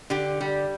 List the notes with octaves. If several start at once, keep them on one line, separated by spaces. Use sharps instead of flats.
D3 G4
G3